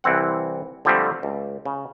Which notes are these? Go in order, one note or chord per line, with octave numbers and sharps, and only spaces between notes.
C2 E3 C4 F#5
D3 F3 G3 A3 C4
C#2
C#3